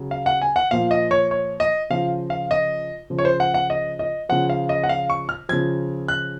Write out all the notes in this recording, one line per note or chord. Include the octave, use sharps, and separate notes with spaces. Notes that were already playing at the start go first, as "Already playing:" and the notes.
Already playing: C#3 F#3
F5
F#5
G#5
F#5
A#2 F3 F5
D#5
C#5
C#5
D#5
C#3 F3 F5
F5
D#5
C#3 F3
C#5
C5
F#5
F#5
D#5
D#5
C#3 F3 F#5
F5
D#5
F#5
F5
C#6
F6
C#3 F3 G#6
F#6